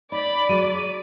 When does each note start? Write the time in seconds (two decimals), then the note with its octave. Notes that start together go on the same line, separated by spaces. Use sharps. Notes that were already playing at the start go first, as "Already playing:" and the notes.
0.12 D#4 D5 B5
0.49 F#3 G#3 D#7